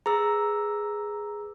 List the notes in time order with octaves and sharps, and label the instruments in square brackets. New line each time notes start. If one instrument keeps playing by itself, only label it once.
[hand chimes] G#4 B4 E6 [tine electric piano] A#5